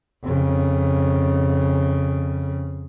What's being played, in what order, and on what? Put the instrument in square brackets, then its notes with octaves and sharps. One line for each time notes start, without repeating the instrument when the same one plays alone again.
[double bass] F2 C#3